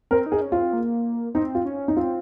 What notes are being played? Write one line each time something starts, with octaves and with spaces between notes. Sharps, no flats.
C4 A#4
D#4
G#4
C#4
F4
C4
A#3
C4 D#4
F4
C#4
D#4
C4 F4